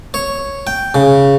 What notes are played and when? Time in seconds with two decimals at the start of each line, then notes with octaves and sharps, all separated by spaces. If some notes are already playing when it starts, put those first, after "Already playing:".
0.14 C#5
0.67 G5
0.95 C#3